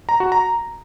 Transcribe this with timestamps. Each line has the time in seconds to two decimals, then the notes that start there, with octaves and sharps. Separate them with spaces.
0.09 A#5
0.20 F#4
0.32 A#5